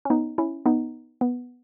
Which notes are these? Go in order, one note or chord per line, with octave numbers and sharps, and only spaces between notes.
C#4
B3 D#4
C#4 E4
B3 D#4
B3